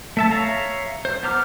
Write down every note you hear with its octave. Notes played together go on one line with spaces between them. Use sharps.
A3 E5 A5
C#5 E5 F5 A#5
C5
B3 C5 A#5 D6 F6